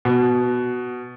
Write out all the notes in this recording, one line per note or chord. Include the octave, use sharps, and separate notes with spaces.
B2